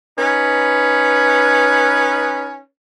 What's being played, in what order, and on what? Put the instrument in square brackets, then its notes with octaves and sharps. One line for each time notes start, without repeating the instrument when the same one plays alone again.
[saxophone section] C#4 D#4 B4